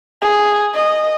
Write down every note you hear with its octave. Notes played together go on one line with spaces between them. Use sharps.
G#4
D#5